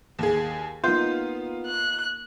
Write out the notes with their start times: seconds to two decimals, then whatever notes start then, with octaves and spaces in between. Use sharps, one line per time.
0.19 D#2 G#4
0.84 A#3 B3 D#4 F4 C6 G6
1.66 F#6